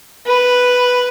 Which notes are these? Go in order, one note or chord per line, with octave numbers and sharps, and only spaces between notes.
B4